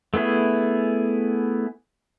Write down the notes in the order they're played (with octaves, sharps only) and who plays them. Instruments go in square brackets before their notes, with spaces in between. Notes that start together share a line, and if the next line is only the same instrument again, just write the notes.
[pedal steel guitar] A3 B3 E4 G#4